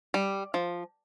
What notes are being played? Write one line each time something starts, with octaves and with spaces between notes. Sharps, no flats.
G3
F3